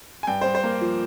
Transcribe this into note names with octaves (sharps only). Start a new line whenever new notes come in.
G#5
G2 G5
G2 C5
C5
A#3
F3